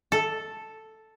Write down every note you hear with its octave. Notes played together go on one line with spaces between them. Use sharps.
A4